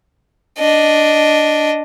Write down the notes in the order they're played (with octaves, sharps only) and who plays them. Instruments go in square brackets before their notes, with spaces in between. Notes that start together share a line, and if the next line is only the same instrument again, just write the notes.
[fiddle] D4 D#5